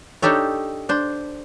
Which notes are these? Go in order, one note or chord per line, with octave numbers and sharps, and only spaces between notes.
D4 D#4 G4 A4 C#5
D4 C5